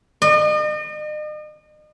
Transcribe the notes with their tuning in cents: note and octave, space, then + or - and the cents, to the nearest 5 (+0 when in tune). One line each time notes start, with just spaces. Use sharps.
D#5 -40